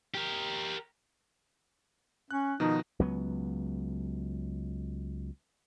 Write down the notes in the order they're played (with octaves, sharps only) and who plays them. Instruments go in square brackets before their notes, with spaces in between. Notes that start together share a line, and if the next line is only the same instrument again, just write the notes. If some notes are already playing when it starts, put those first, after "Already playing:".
[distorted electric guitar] G4 A#4
[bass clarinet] C#4 [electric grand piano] F#6
[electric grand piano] B2 D#3 F3 [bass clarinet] D#4
[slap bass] C#2 F#3 B3